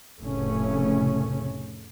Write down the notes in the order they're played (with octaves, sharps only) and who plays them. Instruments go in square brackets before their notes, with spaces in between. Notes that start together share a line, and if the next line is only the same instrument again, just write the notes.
[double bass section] F1 A2 C#3 A3 C#4